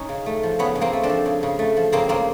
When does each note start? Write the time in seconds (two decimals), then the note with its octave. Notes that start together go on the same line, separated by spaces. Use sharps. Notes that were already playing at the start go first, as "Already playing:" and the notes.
Already playing: C#4 D#4
0.09 C#3
0.26 A3
0.43 F3
0.59 C#3 B3 C#4
0.75 C#3
0.81 A#3 C4
0.93 A3
1.03 C4 D4
1.10 F3
1.26 C#3
1.43 C#3
1.59 A3
1.77 F3
1.92 C#3 A#3 C4
2.09 C#3 A#3 C4